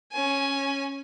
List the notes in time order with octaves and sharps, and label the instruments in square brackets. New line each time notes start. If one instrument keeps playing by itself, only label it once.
[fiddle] C#4 G#5